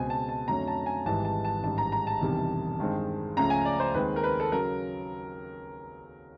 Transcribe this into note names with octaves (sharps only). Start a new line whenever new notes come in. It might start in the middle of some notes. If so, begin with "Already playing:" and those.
Already playing: C#2 B2 G#3 C4 G#5
A5
A5
F2 D3 F#3 A3 C#4 A#5
A5
G#5
G#1 G#2 E3 G3 A5
A5
A5
A1 G#2 D#3 G3 A5
A#5
A#5
A5
E1 E2 C3 D#3 G3
G2 D#3 G#3 C4
C#2 C#3 F3 A3 A#5
G#5
D5
C5
D#2 D#3 G#3 C4 B4
A#4
B4
A4
C#3 F#3 A#4